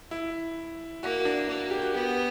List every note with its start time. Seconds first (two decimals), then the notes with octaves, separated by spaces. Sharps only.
0.11 E4
1.03 A#3 F#4
1.25 D4
1.48 A#3 F#4
1.71 G4
1.82 F#4
1.94 B3 G4